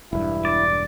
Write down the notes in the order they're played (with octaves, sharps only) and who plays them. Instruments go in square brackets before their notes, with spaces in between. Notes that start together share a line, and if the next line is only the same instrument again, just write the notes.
[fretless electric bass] E1 G2 [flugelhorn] E4
[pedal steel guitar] D5